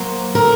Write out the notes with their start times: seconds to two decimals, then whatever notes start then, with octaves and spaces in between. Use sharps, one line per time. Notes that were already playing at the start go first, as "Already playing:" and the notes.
Already playing: F#3 A#3 C5
0.35 D3 A#4